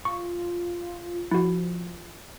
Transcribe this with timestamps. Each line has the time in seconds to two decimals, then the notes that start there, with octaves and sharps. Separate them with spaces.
0.05 F4 C#6
1.31 F3 E4 F#4